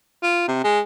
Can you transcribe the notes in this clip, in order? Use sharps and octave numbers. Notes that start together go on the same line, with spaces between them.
F4
C3
G#3